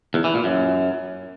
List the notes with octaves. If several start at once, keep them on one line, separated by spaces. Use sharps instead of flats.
E2
E3
A#2
F#2